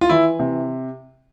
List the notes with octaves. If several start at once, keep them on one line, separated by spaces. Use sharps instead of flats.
F4
E3 E4
C3